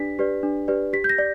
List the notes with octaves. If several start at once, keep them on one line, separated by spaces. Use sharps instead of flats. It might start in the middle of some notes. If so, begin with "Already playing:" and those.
Already playing: D4 G4 B4 D5 B6
G4 B4 D5
D4
G4 B4 D5
G4 B6
G6
A#6
D5